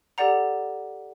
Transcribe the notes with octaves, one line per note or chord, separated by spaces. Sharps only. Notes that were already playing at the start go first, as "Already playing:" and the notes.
G4 A4 D5 F#5 A#5